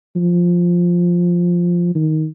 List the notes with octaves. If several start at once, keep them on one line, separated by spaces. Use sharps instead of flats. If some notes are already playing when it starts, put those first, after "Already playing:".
F3
D#3